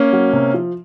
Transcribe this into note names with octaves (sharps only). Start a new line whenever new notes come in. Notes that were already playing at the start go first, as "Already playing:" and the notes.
Already playing: A#3 C#4
F#3
C3
F3